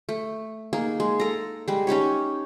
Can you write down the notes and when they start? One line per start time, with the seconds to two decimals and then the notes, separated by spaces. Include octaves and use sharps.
0.09 A3
0.73 A#3 D#4 G#4
1.00 G#3
1.20 A4 A#5
1.68 G3 G#3
1.87 C#4 D#4 G4 C#5